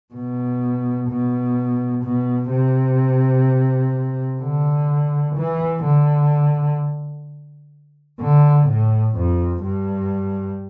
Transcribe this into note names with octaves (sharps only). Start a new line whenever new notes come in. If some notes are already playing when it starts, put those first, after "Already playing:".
B2
B2
B2
C3
D3
E3
D3
D3
A2
F2
G2